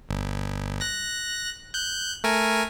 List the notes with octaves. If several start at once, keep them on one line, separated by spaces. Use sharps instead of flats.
G1
F#6 A#6
F#6 G6
A3 A#4 G#5